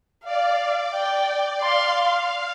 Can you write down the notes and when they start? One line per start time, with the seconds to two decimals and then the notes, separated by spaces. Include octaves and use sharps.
0.25 D5 F5
0.94 G5
1.61 F5 C6